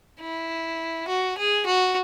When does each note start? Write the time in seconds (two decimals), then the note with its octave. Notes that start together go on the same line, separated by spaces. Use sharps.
0.21 E4
1.08 F#4
1.38 G#4
1.66 F#4